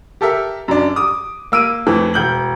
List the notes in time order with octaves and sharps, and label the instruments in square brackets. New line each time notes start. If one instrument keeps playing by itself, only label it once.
[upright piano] G4 A4 A#4 E5
F#2 D4
D6 D#6
A#3 E6 D7 D#7
F2 E3 A3
E1 G6 F#7